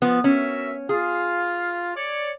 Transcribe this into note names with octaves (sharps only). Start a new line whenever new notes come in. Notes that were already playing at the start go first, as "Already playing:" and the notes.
F3 B3
C#4 F#4 A#4 E5
F4 G#4 F5
C#5 D5